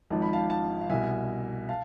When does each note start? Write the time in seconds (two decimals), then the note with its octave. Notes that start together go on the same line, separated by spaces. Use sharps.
0.10 G#1 G#2 F3 A5
0.22 B5
0.33 F5 A5
0.50 F5 A5
0.81 F5
0.89 C2 B2 E5 G#5
1.69 F5 A5